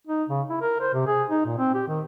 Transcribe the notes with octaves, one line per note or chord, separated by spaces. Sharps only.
D#4
C#3
E4
A#4
C5
C3
G#4
D#4
A#2
C4
G4
D#3